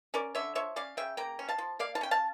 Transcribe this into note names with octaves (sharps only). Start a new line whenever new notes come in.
C#4 A#4 D5
D3 C#5 E5
F3 C#5 E5
C#4 D5 F5
C#3 E5 G5
A#3 G5 A#5
C#4
F5 A5
F3
A#3 D5 F5
F5 A5
C#4 G5
F5 A5